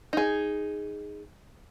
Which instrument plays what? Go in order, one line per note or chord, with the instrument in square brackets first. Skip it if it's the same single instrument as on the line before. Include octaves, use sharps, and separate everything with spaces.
[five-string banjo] D#4 G#4